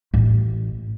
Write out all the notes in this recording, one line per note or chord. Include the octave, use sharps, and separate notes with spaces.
A1